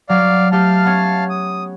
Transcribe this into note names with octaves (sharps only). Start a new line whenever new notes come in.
F#3 D5 F5 F6
A3 G4 F5 A5 F6
B3 C#4
D#6